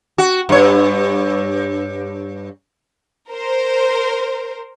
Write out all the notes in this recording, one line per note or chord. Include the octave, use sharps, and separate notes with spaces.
F#4
G2 C#5
A#4 C5